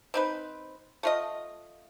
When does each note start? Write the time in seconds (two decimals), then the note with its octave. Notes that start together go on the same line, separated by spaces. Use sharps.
0.14 C4 D#4 B4
1.03 A3 F4 D#5